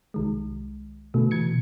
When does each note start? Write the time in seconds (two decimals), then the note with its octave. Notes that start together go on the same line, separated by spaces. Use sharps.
0.14 C2 D#3 G#3
1.14 B2 D3 A3
1.31 E3 G#6 C#7